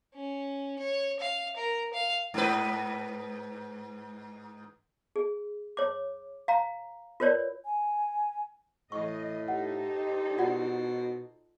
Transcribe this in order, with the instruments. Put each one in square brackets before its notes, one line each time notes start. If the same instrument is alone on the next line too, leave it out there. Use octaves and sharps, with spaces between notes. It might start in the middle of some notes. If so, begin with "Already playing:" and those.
[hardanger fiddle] C#4
C#5
F5
A#4
F5
[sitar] G#2 B4
[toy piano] G#4
C#5 D6
F5 A#5
F4 A#4 B4 C#5 D5
[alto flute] G#5
[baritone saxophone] A2 [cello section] E3 D#5 [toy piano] C#6
[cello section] D#4 A4 C5 [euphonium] G4 [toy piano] F#5
[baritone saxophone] B2 [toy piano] F4 D5 F#5